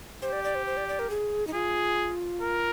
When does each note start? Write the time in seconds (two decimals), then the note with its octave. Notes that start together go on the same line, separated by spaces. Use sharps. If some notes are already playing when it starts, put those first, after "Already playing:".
0.22 G4 C5
0.33 D5
0.44 D5
0.55 C5
0.66 C5
0.77 D5
0.88 D5
0.99 A#4
1.10 G#4
1.47 D#4
1.54 F4 G#4
2.42 A#4